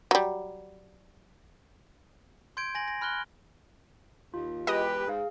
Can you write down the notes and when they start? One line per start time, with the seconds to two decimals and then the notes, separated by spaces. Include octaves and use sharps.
0.11 F#3 G3
2.57 C6 G6 G#6 D7
2.75 G#5 A#6 F#7
2.88 A#6
3.01 B5 F6 F#6 G7
4.34 D#2 F4
4.67 E2 G#3 G4 B4 D#5
5.07 G#2 G#4 F5